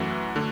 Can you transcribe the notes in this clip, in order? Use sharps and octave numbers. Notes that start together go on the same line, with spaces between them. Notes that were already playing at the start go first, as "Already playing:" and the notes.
Already playing: F#2 E3 A3 F#4
D3 A3 D4